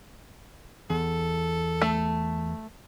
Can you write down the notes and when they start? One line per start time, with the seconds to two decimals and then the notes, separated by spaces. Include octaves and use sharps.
0.90 E2 A4
1.82 A3